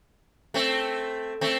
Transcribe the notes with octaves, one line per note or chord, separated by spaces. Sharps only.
A3 C4
A3 C4